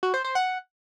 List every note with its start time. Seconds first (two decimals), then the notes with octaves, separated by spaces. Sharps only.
0.03 F#4
0.14 C5
0.24 C5
0.35 F#5